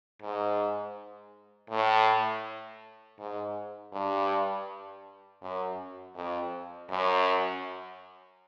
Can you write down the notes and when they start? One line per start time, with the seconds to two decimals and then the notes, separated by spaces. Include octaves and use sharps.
0.22 G#2
1.70 A2
3.19 G#2
3.93 G2
5.42 F#2
6.15 F2
6.90 F#2